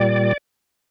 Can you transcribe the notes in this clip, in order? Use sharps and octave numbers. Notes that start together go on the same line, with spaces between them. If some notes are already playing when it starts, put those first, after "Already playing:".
Already playing: A#2 G3 D5